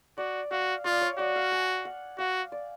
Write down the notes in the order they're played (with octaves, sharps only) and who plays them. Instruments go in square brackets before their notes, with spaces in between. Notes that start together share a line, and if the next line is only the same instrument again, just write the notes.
[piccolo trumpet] F#4 [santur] D5
[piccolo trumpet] F#4 [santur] F5
[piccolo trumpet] F4 [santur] D5
[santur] C#5
[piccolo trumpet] F#4 [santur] D5
[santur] F5
G#5
F#5
[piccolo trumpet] F#4 [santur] F5
[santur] D5